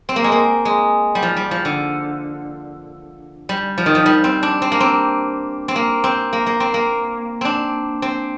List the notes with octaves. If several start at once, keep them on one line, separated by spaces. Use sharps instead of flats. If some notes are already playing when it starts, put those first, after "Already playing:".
C4
A#3
G#3
A#3
G#3
G3
F3
G3
F3
D3
G3
F3
D#3
F3
G3
C4
D4
C4
A#3
C4
C4
A#3
C4
A#3
A#3
C4
A#3
C4 D4
C4